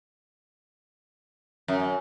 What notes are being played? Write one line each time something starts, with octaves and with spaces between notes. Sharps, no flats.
F#2